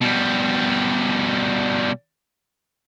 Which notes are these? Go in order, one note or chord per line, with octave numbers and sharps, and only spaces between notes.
B2 G3